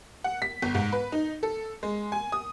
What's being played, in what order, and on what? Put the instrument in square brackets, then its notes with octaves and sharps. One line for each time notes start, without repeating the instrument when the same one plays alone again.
[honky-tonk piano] F#5
B6
G1
G#2
B4
D#4
A4
G#3
G#5
D#6